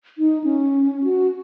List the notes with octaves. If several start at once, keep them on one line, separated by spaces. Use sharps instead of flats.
D#4
C#4
F#4